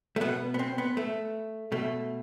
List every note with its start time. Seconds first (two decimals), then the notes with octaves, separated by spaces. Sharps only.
0.16 A3
0.21 B2 B3
0.54 B3
0.59 C4
0.78 B3
0.97 A3
1.72 B2 A3